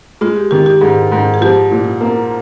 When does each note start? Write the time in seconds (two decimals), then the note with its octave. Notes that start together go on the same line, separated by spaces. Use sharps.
0.21 G#3 F4
0.36 G4
0.51 D#3 G4
0.66 G4
0.81 G#2 G#4
1.12 G#2
1.34 G#4
1.41 F3 G4
1.71 A#2
2.01 A#3